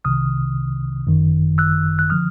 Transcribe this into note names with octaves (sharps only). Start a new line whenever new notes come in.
C2 C3 D#3 D#6 F6
G#1 F#2 D#3
E6 F#6
F#6
D3 F3 D#6 F6